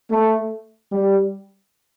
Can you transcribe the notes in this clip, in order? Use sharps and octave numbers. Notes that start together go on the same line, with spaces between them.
A3
G3